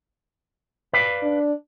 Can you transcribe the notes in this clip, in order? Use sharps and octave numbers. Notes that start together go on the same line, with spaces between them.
B4 D5 F5
D4